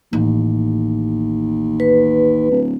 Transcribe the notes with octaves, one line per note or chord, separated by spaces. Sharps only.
A1 D#2
B4
D1